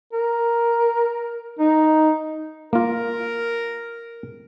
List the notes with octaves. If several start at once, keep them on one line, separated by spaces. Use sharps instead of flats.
A#4
D#4
A#3 F4 A#4